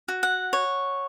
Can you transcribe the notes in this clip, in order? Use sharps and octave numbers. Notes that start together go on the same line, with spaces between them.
F#4
F#5
C#5